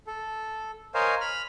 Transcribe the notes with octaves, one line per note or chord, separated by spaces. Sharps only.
A4
A#4 C5 C#5 D#5 F5 G#5
B5 F6